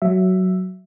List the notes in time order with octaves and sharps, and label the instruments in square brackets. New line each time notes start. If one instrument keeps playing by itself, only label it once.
[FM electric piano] F#3 E5